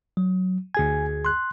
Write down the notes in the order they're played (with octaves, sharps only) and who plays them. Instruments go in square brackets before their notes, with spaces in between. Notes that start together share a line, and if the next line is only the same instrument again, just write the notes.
[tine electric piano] F#3
[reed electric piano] D2 G#4 G#6 [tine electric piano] G#5
[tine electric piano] C6 F#6